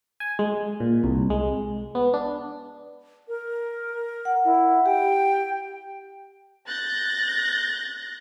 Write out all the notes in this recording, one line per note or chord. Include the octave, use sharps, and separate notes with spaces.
G#5
G#3
A#2
C2
G#3
B3
D4
A#4
F#5
E4
G4 G5
F#6 G6 A6 A#6